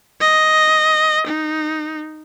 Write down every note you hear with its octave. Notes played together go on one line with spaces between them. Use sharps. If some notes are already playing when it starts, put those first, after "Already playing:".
D#5
D#4